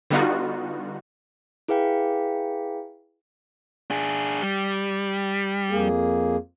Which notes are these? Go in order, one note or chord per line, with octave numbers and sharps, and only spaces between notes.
D3 G3 B3 D#4 F4 F#4
E4 G#4 B4 F5 G5
D4 G#4
G3
F2 A#3 G#4